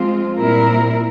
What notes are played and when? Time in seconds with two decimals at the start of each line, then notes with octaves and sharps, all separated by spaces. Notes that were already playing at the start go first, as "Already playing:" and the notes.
Already playing: F3 G#3 C4 F4
0.38 A#2 G3 C4 E4 A#4